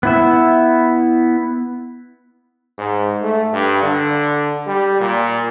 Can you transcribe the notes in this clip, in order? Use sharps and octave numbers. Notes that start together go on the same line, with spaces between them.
B3 E4 E5
G#2
A3
G2
D3
G3
A#2